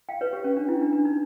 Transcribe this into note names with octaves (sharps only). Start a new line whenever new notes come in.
F5 G5
B4 C#5
G4
C#4
D4
E4
D4
D4
D#4